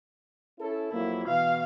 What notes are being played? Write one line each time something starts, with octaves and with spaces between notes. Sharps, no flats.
C#4 E4 A4
F2 F#3 A#3 E4
B2 E3 F5